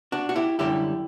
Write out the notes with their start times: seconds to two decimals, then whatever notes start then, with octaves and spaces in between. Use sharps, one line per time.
0.12 D4 F#4
0.29 F#4
0.36 E4 G4
0.59 F#2 D3 G3 E4 G4